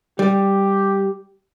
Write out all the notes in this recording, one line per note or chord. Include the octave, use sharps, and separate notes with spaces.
G3 G4